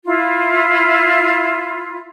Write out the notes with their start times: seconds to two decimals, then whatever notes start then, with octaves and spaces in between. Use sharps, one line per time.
0.05 E4 F4